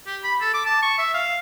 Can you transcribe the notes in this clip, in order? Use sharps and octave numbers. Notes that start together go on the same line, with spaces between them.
G4
B5
A4
D6
A5
C#6
E5
F5